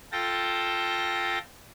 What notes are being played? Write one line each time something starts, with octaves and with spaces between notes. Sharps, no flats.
F4 A4 G5 A5 A#6